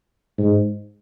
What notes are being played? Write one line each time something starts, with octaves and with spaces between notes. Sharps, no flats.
G#2